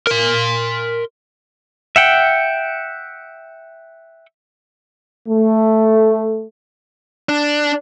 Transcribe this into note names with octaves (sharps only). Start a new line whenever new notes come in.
A#4 C6
E5 F#5 G5
A3
D4